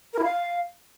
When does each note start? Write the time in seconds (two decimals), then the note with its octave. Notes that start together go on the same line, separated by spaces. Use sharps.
0.13 A#4
0.19 E4
0.24 F5